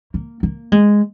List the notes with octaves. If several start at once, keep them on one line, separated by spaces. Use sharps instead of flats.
A#3
A#3
G#3